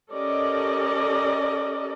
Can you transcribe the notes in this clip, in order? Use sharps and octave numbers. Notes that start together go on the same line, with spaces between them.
C#4 G4 A4 A#4 D5 D#5